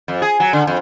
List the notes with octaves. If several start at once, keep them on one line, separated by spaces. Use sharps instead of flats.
F2
G#4
F#3
D3
F2